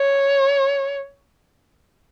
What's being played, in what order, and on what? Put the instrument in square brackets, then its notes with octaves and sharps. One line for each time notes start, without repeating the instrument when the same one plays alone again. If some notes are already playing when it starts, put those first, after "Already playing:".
Already playing: [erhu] C#5